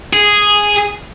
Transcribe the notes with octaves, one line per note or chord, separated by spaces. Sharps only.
G#4